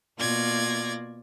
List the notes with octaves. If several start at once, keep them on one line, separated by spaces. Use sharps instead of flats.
B2 A#3 F4 D5 G#6 A#6